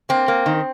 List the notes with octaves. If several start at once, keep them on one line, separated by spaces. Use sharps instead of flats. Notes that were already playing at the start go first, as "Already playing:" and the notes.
A#3 C4
A#3
D#3